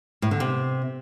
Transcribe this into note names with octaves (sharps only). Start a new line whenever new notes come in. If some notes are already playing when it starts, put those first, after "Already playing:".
A2
D3
C3